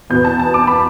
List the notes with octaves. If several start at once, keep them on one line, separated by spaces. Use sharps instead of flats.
E2 B2 B3 G6
A5
A5
D6
B5